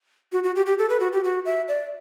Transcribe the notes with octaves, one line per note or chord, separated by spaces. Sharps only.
F#4
F#4
G4
G4
A4
B4
F#4
G4
F#4
E5
D5